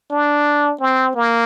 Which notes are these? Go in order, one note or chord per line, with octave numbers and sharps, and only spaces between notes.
D4
C4
A#3